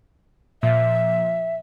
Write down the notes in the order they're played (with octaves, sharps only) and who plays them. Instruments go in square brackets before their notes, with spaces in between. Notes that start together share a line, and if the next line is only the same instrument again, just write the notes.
[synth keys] A#2 F3 [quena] E5